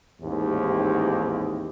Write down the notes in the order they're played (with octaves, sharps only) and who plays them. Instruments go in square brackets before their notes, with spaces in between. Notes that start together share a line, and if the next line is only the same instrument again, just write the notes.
[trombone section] A1 D#2 G#2 C4 E4 G4